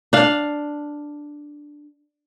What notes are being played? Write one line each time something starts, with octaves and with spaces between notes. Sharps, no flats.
D4 F5